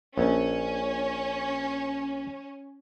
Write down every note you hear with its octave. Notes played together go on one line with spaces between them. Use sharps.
A#1 C#4